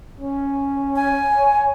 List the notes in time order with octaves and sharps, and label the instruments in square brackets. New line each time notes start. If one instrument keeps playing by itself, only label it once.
[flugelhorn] C#4
[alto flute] G#5
[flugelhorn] C#5